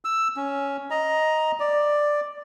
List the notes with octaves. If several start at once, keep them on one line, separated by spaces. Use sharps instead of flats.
E6
C#4
D#5 A#5
D5